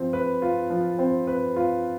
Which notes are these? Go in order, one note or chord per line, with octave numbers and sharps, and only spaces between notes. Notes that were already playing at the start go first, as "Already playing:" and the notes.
Already playing: F3 C4
B4
F4
F3
C4
B4
F4